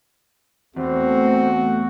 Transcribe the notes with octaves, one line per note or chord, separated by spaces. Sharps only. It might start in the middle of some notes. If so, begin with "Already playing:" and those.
E2 A3 C4 F#4